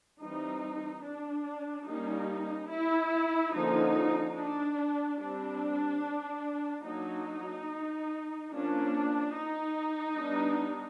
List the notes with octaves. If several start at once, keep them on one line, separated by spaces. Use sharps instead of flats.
E3 G3 C4 D#4
D4
G3 A#3 C#4 D#4
E4
D3 F3 A#3 C#4 D#4
D4
G3 C4 D4
F#3 A#3 D4 D#4
F3 A#3 C#4 D4
D#4
G3 B3 D4